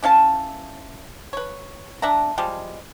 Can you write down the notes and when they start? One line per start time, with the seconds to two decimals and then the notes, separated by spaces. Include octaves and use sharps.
0.03 E3 C#4 F5 A5
1.33 B4 C#5
2.02 D4 E5 F#5 A#5
2.38 F3 G3 G#3